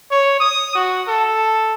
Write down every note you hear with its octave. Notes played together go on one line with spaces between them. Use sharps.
C#5
D#6
F#4
A4